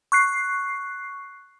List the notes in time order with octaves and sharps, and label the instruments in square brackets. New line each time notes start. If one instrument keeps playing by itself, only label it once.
[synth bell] C#6 F#6 C7